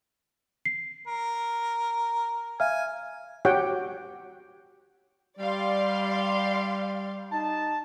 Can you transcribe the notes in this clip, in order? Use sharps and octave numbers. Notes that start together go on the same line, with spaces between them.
C7
A#4
E5 F5 G#5 F6
F#4 G4 C#5 F#5 G5
G3 D5 F5 C6
D#4 A5